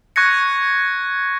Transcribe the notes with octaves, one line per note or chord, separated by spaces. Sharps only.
C#6 F#6 G#6 A#6 C#7